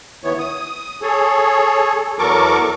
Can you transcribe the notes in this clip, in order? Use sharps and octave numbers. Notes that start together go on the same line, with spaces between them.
D#2 E3 B3 C#5
D#6
G#4 A4 C#5
E2 F#3 A4 A#4 C#6 D6